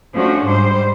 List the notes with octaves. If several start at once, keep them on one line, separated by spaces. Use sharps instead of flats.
F3 A3 C#4 D4 F#4
G#2 G3 C5